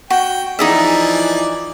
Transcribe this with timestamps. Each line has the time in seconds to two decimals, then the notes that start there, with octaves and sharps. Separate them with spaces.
0.10 F#4 G5
0.59 E3 F3 D#4 G#4 D5 E5